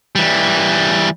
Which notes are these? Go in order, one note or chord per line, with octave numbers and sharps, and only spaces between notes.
E3 G3